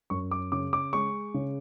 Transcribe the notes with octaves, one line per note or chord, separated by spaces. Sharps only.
F#2 C#6
D6
C#3 D6
D6
G#3 C#6
C#3